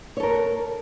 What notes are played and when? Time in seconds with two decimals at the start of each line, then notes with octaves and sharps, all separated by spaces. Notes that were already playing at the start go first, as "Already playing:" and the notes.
0.17 C#5
0.20 A4
0.23 A#4